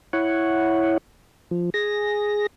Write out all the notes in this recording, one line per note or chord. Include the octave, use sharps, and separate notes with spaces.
E4 C#5 F#5
F3
G#4 A#6